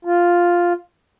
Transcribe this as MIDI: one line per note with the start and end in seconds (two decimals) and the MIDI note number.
0.05 0.73 65